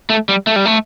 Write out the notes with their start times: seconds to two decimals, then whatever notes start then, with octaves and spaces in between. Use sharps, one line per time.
0.10 A3
0.29 G3
0.47 A3
0.56 G3
0.66 A3